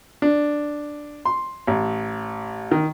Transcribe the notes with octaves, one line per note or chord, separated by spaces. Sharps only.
D4
C6
A1
D#3